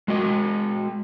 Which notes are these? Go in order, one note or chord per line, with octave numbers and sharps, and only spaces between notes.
G#3 F#4 D#5